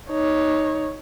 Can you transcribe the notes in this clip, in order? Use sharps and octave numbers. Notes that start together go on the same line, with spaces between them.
D#4 C#5